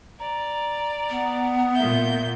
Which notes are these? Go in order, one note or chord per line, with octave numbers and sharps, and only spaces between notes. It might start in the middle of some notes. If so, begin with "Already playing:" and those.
D5 A#5
B3
A#2 E5 G6